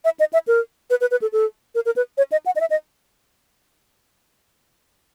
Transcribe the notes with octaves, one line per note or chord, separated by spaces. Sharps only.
E5
D#5
E5
A#4
B4
B4
B4
A4
A4
A#4
A#4
B4
C#5
D#5
F#5
D#5
E5
D#5